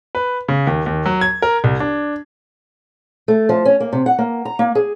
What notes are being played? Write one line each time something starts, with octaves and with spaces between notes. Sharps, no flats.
B4
C#3
D#2
D#2
F#3
G#6
A#4
C2
D4
A3
F3
C#4
A#3
C3
F#5
A#3
A#5
A#3
G#4